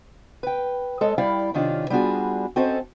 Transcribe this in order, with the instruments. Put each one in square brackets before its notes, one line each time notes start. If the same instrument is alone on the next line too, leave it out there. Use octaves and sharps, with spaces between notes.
[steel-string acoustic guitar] B4 G5
G#3 A4 C#5 D#5
G3 E4 D5 F5 G5
C3 D#3 C#4 D4 F4
G3 B3 D4 F4 F#4 G#4
C4 C#4 F#4 A4 C5 D#5